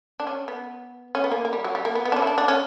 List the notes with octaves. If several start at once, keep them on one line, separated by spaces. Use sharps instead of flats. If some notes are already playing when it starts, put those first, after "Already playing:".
D4
C#4
B3
C#4
B3
A#3
A#3
G3
F#3
G3
A#3
B3
B3
D4
C#4
E4
D4
D4
C#4